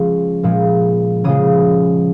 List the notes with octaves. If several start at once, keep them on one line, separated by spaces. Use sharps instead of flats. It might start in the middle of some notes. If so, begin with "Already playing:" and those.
Already playing: C#3 F3 G#3 C#4 C6
A#2 F3 G#3
C#3 F3 G#3 D#6